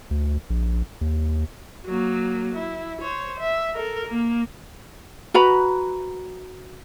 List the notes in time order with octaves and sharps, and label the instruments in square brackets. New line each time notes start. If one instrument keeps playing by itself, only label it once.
[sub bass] D2
A#1
D#2
[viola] F#3 A#3
E4
C5 C#5
E5
A4 A#4
A#3
[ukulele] F#4 B4 A#5 B5